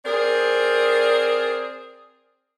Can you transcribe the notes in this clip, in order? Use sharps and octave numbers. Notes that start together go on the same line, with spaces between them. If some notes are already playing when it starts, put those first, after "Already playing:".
C4 G#4 A#4 D5